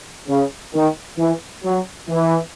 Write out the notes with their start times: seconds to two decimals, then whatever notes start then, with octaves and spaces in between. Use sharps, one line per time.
0.28 C#3
0.73 D#3
1.18 E3
1.64 F#3
2.09 E3